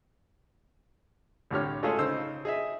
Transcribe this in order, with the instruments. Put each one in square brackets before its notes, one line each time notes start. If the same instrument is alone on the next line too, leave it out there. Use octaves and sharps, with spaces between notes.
[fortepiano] C2 A2 D3 G4 C#5 F6
G#3 A3 C#4 F4 G#4 A4
C#3 D#4 C5 E6
G#4 D#5 E5